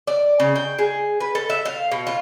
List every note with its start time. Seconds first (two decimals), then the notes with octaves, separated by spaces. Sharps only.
0.07 D5
0.40 C#3
0.56 G5
0.79 G#4
1.20 B4
1.35 A4
1.50 E5
1.65 F5
1.92 B2
2.07 F4